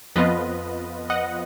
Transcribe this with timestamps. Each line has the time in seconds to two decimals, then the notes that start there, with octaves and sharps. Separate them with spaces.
0.16 F2 F3 B3 F4 B4 D#5
1.10 D#5 F#5